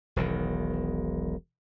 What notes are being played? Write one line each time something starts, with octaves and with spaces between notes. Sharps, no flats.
E1 B1 D#3